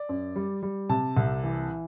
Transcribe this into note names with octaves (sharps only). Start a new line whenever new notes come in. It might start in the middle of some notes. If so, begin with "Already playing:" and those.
Already playing: D5
F#2
G3
G3
C3 A5
C2
E3